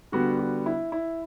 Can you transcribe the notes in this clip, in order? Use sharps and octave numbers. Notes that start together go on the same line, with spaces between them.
D3 G3 B3 F#4
F#4
E4
E4